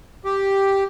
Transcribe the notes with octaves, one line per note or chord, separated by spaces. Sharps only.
G4